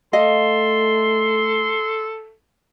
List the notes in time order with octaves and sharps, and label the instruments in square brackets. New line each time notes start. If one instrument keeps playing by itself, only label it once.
[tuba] A3 [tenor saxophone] A4 [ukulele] D#5 F5 [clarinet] C6